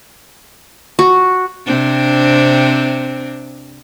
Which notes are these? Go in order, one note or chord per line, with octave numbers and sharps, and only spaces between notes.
F#4
C3 C4 D4